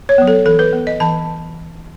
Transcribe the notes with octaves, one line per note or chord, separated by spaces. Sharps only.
C#5
F#3 B3
A4
E3 A4
B4
B3
D#5
E3 A5